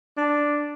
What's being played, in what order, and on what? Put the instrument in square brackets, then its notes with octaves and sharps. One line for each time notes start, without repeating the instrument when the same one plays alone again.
[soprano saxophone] D4